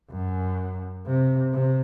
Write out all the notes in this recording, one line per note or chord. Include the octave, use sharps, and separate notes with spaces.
F#2
C3
C3